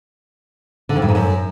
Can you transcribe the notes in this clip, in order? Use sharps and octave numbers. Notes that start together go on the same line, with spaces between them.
D3
F2
G2
G#2
F#2